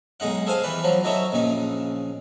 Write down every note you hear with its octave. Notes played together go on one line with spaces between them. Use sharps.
B1 G#3 D#4 F#5
G#4 A4 C5 F5 G#5
E3 G3 B4
F3 F#3
F#3 D#4 A4 C#5 E5
A#1 C#3 D#4